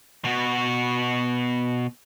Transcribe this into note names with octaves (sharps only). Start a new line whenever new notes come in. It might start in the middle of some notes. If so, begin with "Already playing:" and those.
B2 F#4